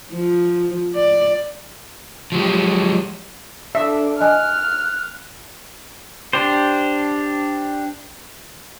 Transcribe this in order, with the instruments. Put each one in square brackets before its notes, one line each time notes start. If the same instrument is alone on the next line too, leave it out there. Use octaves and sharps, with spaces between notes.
[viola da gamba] F3
D5
[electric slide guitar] F3 F#3 G#3 G4
[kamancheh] D4 A4 [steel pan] E5
[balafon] D#5 G#5 [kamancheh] F6 [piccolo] F#6
[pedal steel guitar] D4 G4 C5